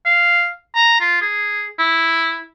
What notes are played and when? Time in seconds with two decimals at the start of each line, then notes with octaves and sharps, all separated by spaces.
0.06 F5
0.75 A#5
1.01 F4
1.21 G#4
1.79 E4